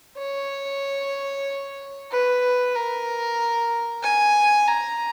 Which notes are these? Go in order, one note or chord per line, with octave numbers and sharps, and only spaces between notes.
C#5
B4
A#4
G#5
A#5